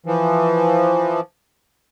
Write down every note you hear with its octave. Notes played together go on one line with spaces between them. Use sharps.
E3 F3